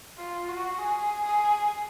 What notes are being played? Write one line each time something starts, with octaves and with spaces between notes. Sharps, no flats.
F4
F#4
G#4
G#4